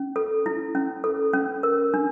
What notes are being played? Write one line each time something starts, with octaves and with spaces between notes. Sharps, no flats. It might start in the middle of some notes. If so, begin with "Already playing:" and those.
Already playing: C#4
A4
E4
C#4
A4
C#4
A#4
D4